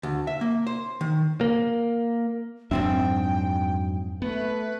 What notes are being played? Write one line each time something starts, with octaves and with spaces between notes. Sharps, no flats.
D2
E5
A#3
C5
D#3
A#3
F2 G#2 F#3 C4 D4 E5 G5
A3 B3 B4